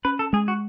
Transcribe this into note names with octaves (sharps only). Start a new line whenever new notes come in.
C#4 B4
A4
G#3 G#4
F#4